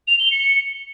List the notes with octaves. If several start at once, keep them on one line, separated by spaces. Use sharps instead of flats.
F7
G7
C#7